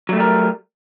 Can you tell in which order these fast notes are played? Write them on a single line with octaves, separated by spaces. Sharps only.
F#3 A3 G3 A#4